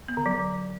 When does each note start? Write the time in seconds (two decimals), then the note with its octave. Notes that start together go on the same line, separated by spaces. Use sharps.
0.08 B3
0.17 D3
0.26 F#3